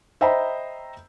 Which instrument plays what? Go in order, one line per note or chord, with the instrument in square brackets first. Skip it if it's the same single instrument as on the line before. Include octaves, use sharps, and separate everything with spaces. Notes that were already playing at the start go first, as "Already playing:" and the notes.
[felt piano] C5 D#5 E5 G5 A#5 B5